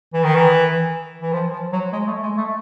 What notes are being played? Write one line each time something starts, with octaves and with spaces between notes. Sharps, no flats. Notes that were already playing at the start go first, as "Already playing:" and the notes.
E3
D#3
E3
E3
F3
F3
F#3
G#3
A3
G#3
A3